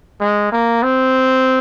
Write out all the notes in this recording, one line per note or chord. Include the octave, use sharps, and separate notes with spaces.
G#3
A#3
C4